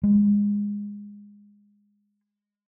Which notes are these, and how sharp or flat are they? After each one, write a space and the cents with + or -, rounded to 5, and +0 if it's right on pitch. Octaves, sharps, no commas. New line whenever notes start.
G#3 -20